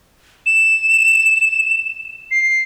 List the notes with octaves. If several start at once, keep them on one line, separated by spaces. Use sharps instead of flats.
E7
C7